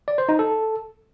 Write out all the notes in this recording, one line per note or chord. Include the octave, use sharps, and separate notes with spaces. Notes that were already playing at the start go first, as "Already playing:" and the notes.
D5
C5
D#4
A4